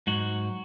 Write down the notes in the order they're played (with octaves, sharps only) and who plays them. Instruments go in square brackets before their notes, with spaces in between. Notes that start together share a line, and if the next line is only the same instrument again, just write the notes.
[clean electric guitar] G#2 F#3 F#4